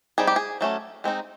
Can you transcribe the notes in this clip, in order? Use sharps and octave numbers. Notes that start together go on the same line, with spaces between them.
G3 C4 D#4 G#4
G4
G#4
F#3 A3 C#4
G#3 C4 D#4